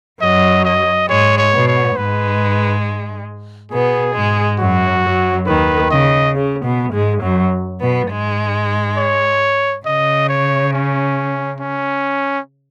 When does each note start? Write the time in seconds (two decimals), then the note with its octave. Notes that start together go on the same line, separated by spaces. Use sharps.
0.21 F#2 F#3 D#5
0.65 D#5
1.09 G#2 G#3 C#5
1.38 C#5
1.52 B2 B3
1.68 C#5
1.96 G#2 G#3 B4
3.72 B2 B3 G#4
4.15 G#2 G#3
4.59 F#2 F#3 F#4
5.04 F#2 F#3
5.47 D#2 D#3 B4
5.90 C#3 D#5
6.35 C#3
6.64 B2 B3
6.93 G#2 G#3
7.22 F#2 F#3
7.81 B2 B3
8.09 G#2 G#3
8.97 C#5
9.85 C#3 D#5
10.29 C#5
10.73 C#4
11.60 C#4